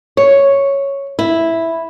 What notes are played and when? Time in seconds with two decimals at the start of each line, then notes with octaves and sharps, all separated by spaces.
0.17 C#5
1.19 E4